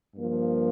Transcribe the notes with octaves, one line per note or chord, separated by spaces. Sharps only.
G2 F3 A#3